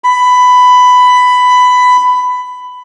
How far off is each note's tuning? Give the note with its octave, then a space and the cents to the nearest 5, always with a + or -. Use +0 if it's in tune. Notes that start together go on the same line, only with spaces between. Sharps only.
B5 +15